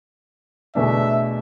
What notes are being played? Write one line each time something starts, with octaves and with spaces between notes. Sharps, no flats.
E2 B2 A3 D4 E5